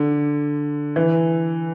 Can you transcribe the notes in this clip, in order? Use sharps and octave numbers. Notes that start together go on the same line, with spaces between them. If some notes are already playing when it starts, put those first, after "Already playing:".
Already playing: D3
E3